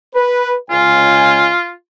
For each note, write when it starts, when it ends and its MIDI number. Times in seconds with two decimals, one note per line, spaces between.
0.15 0.55 71
0.71 1.50 37
0.71 1.71 65
0.71 1.50 80